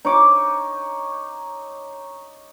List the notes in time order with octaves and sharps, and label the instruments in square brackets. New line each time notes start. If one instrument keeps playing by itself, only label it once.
[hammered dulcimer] D#4 C#5 D6